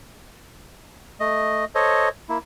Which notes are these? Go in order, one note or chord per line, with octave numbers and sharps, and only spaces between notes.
A3 D#5
A4 C5 C#5 D#5
A#3 E4